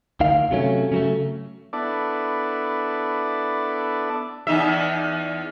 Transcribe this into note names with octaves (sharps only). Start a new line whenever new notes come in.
D2 D#3 F5
C3 F#3 A3 C#4
C#3 F#3 A3
B3 D4 E4 A4 D5
E2 D#4 E5